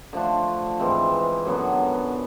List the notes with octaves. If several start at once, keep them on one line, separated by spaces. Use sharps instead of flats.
D3 F3 A3 D4
G#2 E3 G#3 C4
F#2 D3 F#3 B3